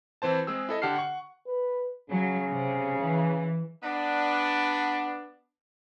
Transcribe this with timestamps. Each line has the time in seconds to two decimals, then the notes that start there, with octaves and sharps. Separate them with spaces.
0.22 E3 C4 C5 A5
0.47 G#3 C4 G#4 E6
0.69 E4 A4 D#5
0.82 D3 G4 F#5 A5 F6 C7
0.95 F#5 C#6
1.47 B4
2.10 C#3 F#3
2.51 C3
3.01 E3
3.82 B3 D4